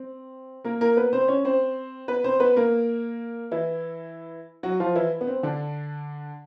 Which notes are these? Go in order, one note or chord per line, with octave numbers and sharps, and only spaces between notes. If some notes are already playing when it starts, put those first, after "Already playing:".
Already playing: C4
A#3 A#4
A#3 A#4
B3 B4
C4 C5
C#4 C#5
C4 C5
B3 B4
C4 C5
B3 B4
A#3 A#4
E3 E4
F#3 F#4
F3 F4
E3 E4
B3
C4
D3 D4